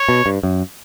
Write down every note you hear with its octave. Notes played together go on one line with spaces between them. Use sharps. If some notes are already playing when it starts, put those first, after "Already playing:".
Already playing: C#5
B2
G2
F#2